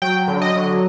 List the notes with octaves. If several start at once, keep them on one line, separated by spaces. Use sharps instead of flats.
F#3 G5
D3
D#5
F#3